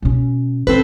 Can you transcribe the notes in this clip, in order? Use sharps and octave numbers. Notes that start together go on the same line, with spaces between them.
B2 C#4
D#3 C4 A4 B4